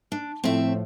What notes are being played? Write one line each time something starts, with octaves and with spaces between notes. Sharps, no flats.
D4
A2 F3 A3 C4 E5